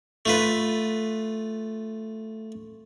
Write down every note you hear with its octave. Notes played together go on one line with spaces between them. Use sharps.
A3 F4 B4